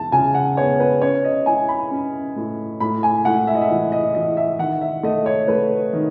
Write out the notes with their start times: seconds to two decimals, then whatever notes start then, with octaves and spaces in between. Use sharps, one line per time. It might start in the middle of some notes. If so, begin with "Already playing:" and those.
Already playing: E2 A5
0.12 C#3 G#5
0.35 F#5
0.57 B3 C#5
0.80 B4
1.02 C#4 C#5
1.24 D#5
1.46 E4 G#5
1.69 B5
1.91 C#4
2.36 A2
2.80 A2 B5
3.03 G#5
3.25 A2 F#5
3.47 E5
3.55 D#5
3.61 E5
3.70 E3
3.92 D#5
4.15 E3 D#5
4.37 E5
4.59 D#3 F#5
4.81 E5
5.03 A3 D#5
5.26 C#5
5.48 A3 B4
5.93 D#3